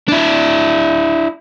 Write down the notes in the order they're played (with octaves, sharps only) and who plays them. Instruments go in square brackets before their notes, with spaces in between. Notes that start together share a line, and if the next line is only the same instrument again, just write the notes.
[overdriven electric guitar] D4 E4